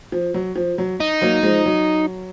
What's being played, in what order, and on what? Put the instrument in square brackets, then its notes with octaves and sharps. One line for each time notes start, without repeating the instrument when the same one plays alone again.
[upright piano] F3
F#3
F3
F#3
[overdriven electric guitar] D#4
[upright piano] F#3 A#3
F3 G#3
F#3